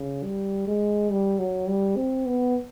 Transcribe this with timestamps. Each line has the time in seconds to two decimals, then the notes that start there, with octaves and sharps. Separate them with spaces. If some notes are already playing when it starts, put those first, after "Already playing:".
Already playing: C#3
0.23 G3
0.67 G#3
1.10 G3
1.39 F#3
1.67 G3
1.96 C4
2.26 B3